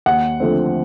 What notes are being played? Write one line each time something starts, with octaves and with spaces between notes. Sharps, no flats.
D#2 F#5
D3 F3 A3 C4